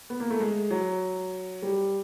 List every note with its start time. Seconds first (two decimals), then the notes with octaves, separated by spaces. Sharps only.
0.10 B3
0.20 A#3
0.30 A3
0.40 G#3
0.71 F#3
1.62 G3